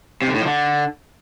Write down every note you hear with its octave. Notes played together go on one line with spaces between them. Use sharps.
C3
D3
A2
F3
D3